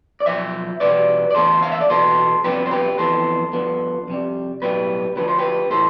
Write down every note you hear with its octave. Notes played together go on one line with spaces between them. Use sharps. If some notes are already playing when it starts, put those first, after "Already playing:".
D5
B1 A2 F3 C5 E5
E2 B2 G3 B3 B4 D5
D5
E2 D3 A3 A4 C5
F5
E5
D5
E2 B2 B3 A4 C5
F2 C3 G3 B3 G4 B4
C5
G4 B4
F2 E3 B3 A4 C5
G2 D3 F3 B3
F2 C3 G3
B1 A2 G3 B3 G4 B4
D2 D3 F3 B4
C5
G4 B4
A2 E3 A4 C5